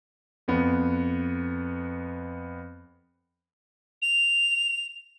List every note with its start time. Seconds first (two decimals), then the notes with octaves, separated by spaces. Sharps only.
0.48 F2 B3
4.02 F7